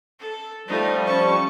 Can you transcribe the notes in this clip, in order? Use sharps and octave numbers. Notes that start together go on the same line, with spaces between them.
A4
F3 G3 A3 D#4
C#4 A5 C#6